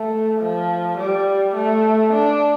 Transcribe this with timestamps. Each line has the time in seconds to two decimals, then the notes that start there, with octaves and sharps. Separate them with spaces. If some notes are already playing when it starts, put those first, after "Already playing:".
Already playing: A3
0.40 F3
0.97 G3
1.55 A3
2.13 D4